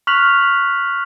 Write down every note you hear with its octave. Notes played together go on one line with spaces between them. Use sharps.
C#6 F6 F#6 B6 F7 F#7